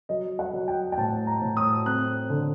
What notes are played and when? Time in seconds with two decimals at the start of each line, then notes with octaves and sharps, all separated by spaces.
0.09 F#3 D#5
0.39 F#5
0.53 F#3
0.68 G5
0.92 G5
0.97 A2 A5
1.27 A#5
1.41 A2
1.57 D#6
1.86 C4 F#6
2.30 D3